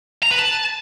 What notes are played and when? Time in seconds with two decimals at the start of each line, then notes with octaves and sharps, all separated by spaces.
0.23 A#5
0.31 B4
0.39 A5